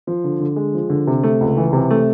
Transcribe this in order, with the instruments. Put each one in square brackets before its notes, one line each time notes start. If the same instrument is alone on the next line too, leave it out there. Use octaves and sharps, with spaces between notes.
[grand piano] F3
D3
D3
G#3
F3
D3
C3
A3
C#2
E3
C3
A3